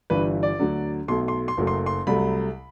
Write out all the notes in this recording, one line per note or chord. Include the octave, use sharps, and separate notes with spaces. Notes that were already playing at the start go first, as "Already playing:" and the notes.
G1 G2 E3 G3 B4
D5
D2 D3 F#3
B1 B2 A3 C6
C6
C6
F#1 F#2 F#3 A3
C6
C6
C2 C3 F#3 A3 B5